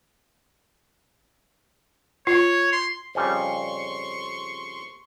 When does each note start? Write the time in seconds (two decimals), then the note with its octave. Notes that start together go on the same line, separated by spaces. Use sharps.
2.27 F4 C#5
2.72 C6
3.15 F2 C#3 G3 C6 C#6